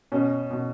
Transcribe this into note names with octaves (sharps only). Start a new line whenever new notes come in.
B2 C#4
B2